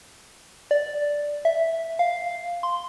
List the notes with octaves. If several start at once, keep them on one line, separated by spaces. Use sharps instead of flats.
D5
E5
F5
C6